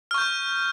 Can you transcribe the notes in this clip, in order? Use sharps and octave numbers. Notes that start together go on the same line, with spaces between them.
C#6 F6 G6